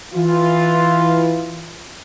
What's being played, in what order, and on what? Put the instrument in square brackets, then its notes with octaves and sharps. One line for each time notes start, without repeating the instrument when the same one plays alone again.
[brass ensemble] E3 F4